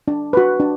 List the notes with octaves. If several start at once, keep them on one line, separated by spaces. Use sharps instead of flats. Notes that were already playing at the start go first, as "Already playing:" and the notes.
D4
F#4 B4
D4